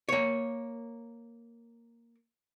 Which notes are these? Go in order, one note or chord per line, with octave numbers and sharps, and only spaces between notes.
A#3 C#5